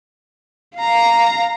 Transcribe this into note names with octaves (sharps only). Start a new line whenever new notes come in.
F5 A#5